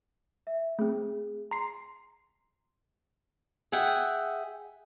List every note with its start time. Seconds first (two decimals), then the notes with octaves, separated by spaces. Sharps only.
0.47 E5
0.79 A3 C4 G#4
1.51 A#5 C6 C7
3.72 G#4 E5 F#5 G5